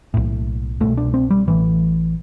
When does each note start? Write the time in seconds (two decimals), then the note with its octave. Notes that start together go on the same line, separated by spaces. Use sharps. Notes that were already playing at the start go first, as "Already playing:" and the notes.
0.14 B1 A2
0.80 C2 B2 A3
0.97 D4
1.14 C4
1.31 G3
1.47 A1 A2 E3